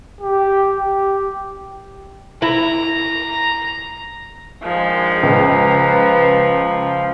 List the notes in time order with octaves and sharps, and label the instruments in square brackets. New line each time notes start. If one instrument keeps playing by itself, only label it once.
[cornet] G4
G4
[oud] E4 [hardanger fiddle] A#5
[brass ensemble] A#1 D#3 G#3 [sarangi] F3
[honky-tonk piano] C#2 [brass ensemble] B4 A#5